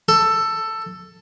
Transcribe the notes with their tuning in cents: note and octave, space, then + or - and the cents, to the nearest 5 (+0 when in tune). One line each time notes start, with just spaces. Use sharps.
A4 +10